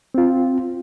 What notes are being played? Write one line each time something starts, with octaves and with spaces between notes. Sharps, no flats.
C4 F4